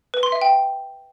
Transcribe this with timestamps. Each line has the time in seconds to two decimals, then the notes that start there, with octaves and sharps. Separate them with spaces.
0.14 B4
0.23 C6
0.32 E5
0.41 G5